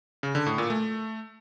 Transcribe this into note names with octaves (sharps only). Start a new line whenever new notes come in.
C#3
D3
A2
A#2
A3